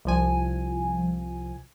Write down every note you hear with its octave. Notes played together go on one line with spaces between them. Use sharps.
C2 F3 G#5